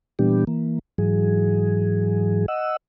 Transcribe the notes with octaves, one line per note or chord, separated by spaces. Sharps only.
A#2 E3 G3 B3 D4 G4
E3 A#3
G#2 E3 F#3 G#4
D#5 F#5 E6